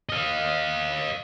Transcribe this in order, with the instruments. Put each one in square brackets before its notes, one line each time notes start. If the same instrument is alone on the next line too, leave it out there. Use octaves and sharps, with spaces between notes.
[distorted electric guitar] D#5 F5